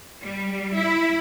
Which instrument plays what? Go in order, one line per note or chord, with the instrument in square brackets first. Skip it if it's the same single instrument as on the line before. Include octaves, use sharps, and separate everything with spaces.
[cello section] G3
E4